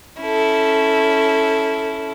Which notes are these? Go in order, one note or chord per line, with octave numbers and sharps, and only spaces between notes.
C#4 E4 A4